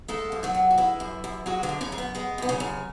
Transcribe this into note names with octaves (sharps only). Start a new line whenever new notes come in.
G#3 A3 A4
F#2
F#3 F#4
F#2
F#4
E3 G#3 E4
F#2
F#2
F#3 G#3 F#4
D3 D4
F#2
C#3 C#4
F#2
B3
G#3 B3
F#2 B3
C#3 C#4
F#2